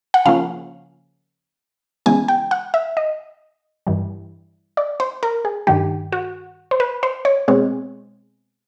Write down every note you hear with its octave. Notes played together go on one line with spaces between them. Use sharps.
F#5
C#3 F3 A#3 C#4 F5
C#3 E3 G#3 B3 G#5
G5
F#5
E5
D#5
G2 E3 G3
D5
C5
A#4
G#4
G2 D#3 G3 G4
F#4
C5
B4
C5
C#5
B2 G#3 C4 C#5